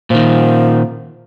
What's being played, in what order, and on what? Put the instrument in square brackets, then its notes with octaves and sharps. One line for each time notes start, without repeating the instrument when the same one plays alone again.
[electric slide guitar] A#2 D#3 [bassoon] F3